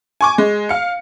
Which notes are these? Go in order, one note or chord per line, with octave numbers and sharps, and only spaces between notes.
G#5 C#6 D6
G#3
F5 C#7